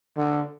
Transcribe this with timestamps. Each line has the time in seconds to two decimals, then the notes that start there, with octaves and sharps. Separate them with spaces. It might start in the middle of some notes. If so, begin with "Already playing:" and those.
0.17 D3